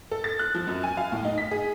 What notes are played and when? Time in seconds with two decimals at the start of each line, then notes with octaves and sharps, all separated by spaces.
0.11 A4
0.24 A6
0.39 F#6
0.55 F3
0.67 F#2
0.83 G#5
0.97 F5
1.12 A2
1.25 D#4
1.38 B6
1.51 G#4